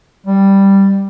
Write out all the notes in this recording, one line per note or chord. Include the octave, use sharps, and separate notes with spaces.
G3